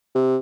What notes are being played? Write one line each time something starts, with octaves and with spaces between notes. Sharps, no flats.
C3